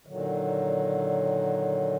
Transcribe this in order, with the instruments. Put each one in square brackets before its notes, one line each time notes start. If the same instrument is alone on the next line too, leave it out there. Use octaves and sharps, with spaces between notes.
[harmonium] A#2 D3 D#3 F#3